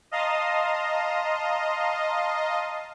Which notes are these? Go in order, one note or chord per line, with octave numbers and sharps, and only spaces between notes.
D#5 F5 A5 A#5 C6 D#6